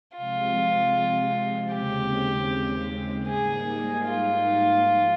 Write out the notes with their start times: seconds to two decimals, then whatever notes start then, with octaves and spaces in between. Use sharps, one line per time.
0.17 C3 F3 G#3 C4 F4
1.72 D#2 C#3 G#3 C4 G4
3.28 G#2 G3 A#3 D#4 G#4
4.06 F4
4.84 G#2 F3 G#3